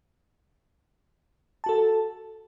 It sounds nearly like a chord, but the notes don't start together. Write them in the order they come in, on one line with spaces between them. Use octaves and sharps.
A5 F#4 A4